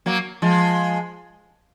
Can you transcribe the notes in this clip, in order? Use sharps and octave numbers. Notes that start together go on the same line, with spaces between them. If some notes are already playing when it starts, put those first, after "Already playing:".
F#3 A#3
F3 G#3